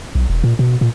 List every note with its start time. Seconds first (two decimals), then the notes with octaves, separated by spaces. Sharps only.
0.15 B1
0.30 E1
0.44 A#2
0.59 B2
0.81 A#2